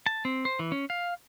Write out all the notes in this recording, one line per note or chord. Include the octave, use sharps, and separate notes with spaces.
A5
C4
C5
E3
C#4
F5